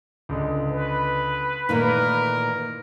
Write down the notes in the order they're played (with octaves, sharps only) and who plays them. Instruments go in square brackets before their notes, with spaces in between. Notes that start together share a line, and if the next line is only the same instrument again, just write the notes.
[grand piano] C#2 D3 G#3
[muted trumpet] B4
[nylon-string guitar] A#2 E3 A3 [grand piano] D#3 A#3 [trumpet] A#4